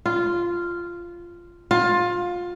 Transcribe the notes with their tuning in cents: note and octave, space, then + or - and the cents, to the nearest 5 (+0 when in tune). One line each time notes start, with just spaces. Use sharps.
F4 -10
F4 +20